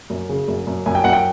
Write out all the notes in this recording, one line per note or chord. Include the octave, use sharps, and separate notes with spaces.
F#2
C#3
F#2
F#2
F#2 G#5
G5
F#2 F#5
G5